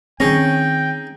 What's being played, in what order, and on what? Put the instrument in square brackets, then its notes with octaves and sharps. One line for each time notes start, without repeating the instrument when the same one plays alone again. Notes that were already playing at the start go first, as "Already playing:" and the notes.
[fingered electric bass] D#3 C4 [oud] C#4 [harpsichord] D#4 G#4 A#5 [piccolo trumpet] G5